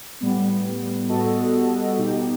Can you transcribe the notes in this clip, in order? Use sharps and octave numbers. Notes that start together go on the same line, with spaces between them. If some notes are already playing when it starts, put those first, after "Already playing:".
A2 G3 B3
G3 B3 F#4 A4 D#5
B2 G3 D#4 G4